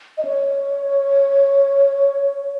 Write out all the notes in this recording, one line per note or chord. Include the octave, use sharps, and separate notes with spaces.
D#5
C#5